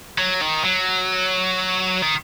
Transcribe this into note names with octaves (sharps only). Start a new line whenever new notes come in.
F#3
D#3
F#3
D#3